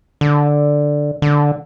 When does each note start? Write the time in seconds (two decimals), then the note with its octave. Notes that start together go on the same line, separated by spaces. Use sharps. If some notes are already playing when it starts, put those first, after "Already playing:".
0.21 D3
1.22 D3